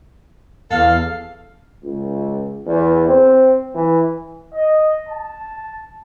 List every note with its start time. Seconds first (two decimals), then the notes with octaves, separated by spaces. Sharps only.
0.71 E2 A4 F5
1.84 C#2
2.66 E2
3.08 C4
3.75 E3
4.54 D#5
5.09 A5